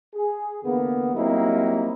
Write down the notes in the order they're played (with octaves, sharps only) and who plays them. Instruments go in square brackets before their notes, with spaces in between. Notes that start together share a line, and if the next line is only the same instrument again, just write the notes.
[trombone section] G#4
E2 D3 A#3 B3
F#3 G3 A#3 C4 D#4 E4